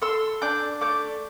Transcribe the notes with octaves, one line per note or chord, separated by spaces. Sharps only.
A4 C6 E6
D4 D6 G6
A3 D6 G6